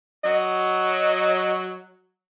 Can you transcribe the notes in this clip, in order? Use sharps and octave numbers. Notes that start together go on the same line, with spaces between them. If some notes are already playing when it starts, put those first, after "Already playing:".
F#3 D#5